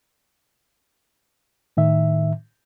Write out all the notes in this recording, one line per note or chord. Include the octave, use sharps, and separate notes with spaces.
A2 D#3 E5